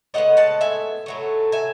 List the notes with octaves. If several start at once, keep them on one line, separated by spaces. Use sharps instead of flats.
A2 G#3 B3 D#5 F#5
F#5 A5
E5 G#5
A2 F#3 A3
E5 G#5